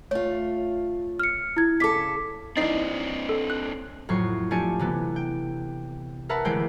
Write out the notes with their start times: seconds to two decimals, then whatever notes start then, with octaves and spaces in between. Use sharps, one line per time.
0.11 A3 F4 C#5
1.19 F6 C#7
1.57 E4 G#6
1.80 C#3 A4 D6 B6
2.57 E3 C4 D4 D#4 A6 C7
3.29 A4
3.50 F#6
4.09 F2 A2 F#3 C#6 C7
4.51 F3 A3 D4 G4 G#5 C#7
4.79 C3 E3 B3
5.16 G5
6.29 A#4 B4 E5 F#5 A5 B5
6.45 D2 E3 G#3 C5 G5